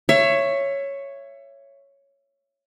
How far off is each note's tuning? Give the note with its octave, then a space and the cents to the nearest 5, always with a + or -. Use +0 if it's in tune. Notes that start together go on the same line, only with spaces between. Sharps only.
C#5 +0 E5 +25